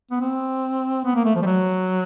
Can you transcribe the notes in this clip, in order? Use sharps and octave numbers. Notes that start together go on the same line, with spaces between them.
B3
C4
B3
A#3
A3
F3
G3
F#3